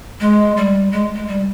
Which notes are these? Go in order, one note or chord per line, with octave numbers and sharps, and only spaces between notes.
G#3
G3
G#3
G#3
G3